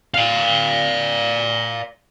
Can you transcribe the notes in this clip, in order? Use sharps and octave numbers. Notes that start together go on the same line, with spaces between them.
D5 F5